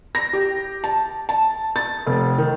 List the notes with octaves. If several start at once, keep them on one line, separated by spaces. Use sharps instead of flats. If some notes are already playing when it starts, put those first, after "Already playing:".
A#6
G4
A5
A5
A6
F1
D#3